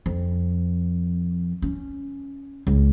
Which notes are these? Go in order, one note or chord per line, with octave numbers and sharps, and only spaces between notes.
F2
C#4
C#2